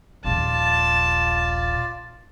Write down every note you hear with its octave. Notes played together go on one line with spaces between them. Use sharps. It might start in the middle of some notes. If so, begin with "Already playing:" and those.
D#1 A#1 F4 D5 A5